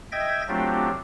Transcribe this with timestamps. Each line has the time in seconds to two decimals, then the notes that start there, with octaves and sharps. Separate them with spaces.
0.12 D#5 E5 G5 G#6 A#6
0.48 F#3 A3 C4 D4 F4 G4